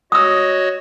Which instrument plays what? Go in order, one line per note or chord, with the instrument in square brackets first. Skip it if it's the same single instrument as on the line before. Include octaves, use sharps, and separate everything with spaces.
[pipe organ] F#4 C#5 D#5 [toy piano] D#6 E6